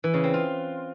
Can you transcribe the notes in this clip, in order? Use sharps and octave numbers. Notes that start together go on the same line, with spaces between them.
E3
C#3
C4
F4